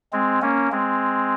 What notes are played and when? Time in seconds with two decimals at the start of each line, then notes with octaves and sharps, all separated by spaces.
0.13 G#3 C4
0.42 A#3 C#4
0.72 G#3 C4